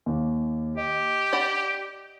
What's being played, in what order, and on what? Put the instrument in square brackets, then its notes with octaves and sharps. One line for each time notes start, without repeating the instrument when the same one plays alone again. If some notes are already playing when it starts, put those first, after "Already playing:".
[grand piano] D#2
[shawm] G4 [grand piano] D#5
[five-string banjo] D5 F#5 B5